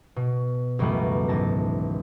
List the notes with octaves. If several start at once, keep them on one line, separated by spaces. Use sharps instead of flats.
B2
C#2 F#2 E3 G3 A3 B3
G#1 A5 A#6